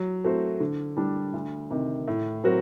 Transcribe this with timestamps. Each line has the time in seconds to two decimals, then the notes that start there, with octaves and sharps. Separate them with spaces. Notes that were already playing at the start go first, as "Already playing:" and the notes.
Already playing: F#3
0.24 A3 C4 F#4 C5
0.60 D3
0.97 G3 D4
1.34 D2
1.71 C3 D#3
2.08 A2
2.44 F#3 C4 F#4 A#4